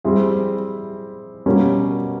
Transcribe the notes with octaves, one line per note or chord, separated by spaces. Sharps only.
G3 C4 E4 G#4
B2 G3 A#3 C#4